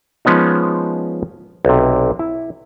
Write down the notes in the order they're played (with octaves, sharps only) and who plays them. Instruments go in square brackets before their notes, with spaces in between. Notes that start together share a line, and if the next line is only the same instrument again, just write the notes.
[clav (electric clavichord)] F3 G#3 B3 C#4 D#4
B1 C3
E4